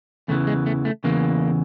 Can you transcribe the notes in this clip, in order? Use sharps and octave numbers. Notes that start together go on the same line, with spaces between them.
E2 C#3 E3 A3
G#3
A3
A3
E2 C#3 E3 A#3